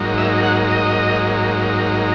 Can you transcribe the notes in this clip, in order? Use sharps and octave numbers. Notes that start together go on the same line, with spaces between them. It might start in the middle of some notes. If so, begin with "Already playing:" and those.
Already playing: G#2 F#3 A#3 D#4
E5
F#5
D#5